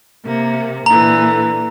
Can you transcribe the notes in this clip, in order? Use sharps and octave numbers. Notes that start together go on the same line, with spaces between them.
C3 A#3
A#2 D3 E3 A#5